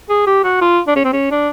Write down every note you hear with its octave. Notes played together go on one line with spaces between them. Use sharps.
G#4
G4
F#4
F4
D4
C#4
C4
C#4
D4